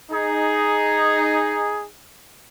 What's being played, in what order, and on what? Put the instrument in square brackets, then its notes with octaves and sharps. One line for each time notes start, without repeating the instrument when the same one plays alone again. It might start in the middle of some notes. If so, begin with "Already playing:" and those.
[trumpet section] D#4 G#4